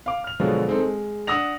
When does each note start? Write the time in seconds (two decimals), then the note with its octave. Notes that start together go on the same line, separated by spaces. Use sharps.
0.06 F5 D6
0.24 F6 F7
0.40 B2 D3 F3 F#3 G#3 B3
0.68 G#3 C4 D#4 A4
0.80 G#3
1.27 D4 F#5 D#6 E6 A#6 F7